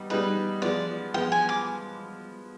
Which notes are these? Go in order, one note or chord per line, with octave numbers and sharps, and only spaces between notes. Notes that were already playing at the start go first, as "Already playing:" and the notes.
Already playing: G3 B3 D#4
G3 B3 D#4 G#4 B4
F3 G#3 B3 D5
F3 G#3 B3 G5
G#5
D6